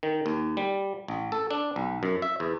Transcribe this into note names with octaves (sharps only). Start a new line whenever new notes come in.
D#3
D#2
G3
A1
A4
D4
B1
F#2
E5
E2